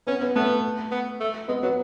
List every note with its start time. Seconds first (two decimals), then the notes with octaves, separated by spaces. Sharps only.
0.07 B3 C#4
0.22 B3
0.36 A3 B3
0.92 B3
1.20 A3
1.48 G#3 B3
1.63 F#3 B3